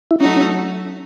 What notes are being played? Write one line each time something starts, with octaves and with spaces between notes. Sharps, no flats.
E4
F#3 A3 C#4 D#4 F#4
C#4